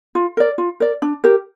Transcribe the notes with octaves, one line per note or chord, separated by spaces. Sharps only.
F4
A#4 D5
F4
A#4 D5
D4
G4 A#4